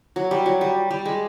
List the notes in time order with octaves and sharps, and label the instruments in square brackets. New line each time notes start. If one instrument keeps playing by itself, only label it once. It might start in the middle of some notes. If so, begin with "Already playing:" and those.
[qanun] F#3
G3
F#3
G3
G3
G#3